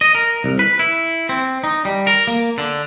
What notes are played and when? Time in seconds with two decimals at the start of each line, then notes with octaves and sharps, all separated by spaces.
0.01 D#5
0.15 A#4
0.44 C2
0.59 B4
0.79 E4
1.29 C4
1.64 D#4
1.85 G3
2.07 A#4
2.27 A#3
2.58 D3